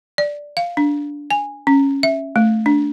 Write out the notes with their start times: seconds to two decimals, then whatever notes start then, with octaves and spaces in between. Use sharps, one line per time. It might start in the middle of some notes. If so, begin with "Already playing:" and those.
0.18 D5
0.57 F5
0.77 D4
1.31 G#5
1.67 C#4
2.03 E5
2.36 A3
2.66 D4